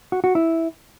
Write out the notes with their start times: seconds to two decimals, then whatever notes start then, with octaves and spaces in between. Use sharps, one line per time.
0.12 F#4
0.24 F#4
0.35 E4